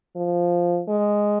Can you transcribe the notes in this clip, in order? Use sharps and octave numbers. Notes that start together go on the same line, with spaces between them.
F3
G#3